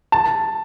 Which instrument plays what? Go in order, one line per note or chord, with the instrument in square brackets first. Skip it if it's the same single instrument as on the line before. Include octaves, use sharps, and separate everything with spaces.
[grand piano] A5